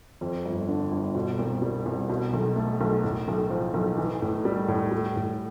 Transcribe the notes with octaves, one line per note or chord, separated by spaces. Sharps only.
F2
G1
D3
G1
B2
C2
G3
C2
B2
B1
A3
B1
A2
B1
F3
B1
E3
A2
G3
A2
G3
A2